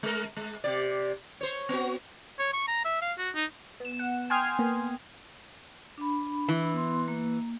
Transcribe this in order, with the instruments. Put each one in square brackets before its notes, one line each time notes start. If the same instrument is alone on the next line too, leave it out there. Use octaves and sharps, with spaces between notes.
[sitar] G#3 A#4
G#3
C3 G4 D5
C5 C#5
B3 F#4
[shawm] C#5
C#6
A#5
E5
F5
F#4
D#4
[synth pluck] B3 E7
F#5
G5 G#5 C6 D#6 F6 G#6
A#3 B3
[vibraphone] D4 B5
[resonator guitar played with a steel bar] E3
[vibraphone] B3 C6
A#3